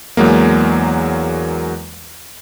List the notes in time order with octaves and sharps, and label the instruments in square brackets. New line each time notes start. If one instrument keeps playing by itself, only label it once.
[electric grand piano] E2 F#3 G#3 A#3